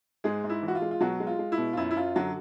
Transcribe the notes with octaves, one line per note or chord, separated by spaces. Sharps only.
G#2 G#3 G#4
G#2
E4
E3
F#4
F4
G#3
F4
B2 F#3 F#4
G#3
F4
G#3
E4
B2
F4
F#2 E4
E4
F#2 F4
D3 F#3 F#4